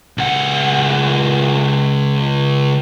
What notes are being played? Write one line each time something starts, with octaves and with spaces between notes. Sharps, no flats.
C#2 F#5